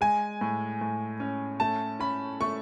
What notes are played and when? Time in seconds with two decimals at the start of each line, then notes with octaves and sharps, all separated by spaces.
0.01 G#3 G#5
0.41 A2
0.81 A2
1.20 C#4
1.60 A3 A5
2.00 C#4 B5
2.40 A3 C#6